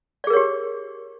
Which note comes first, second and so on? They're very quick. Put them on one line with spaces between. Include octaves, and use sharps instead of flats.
D5 G#4 A#4 C#5 G4